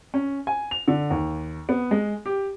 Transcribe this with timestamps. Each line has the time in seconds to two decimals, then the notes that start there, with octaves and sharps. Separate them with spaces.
0.14 C#4
0.47 G#5
0.71 F7
0.88 D3
1.10 D#2
1.69 B3
1.91 G#3
2.26 G4